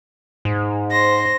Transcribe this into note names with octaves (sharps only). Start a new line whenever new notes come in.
G#2
C5 A#6